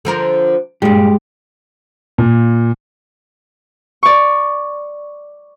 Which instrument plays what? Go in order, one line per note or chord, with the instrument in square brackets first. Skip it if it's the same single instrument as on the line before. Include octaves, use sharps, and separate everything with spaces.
[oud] D3 F3 A#4
[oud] G2 A#2 [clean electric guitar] G#3 G4
[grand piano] A#2
[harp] D5 C#6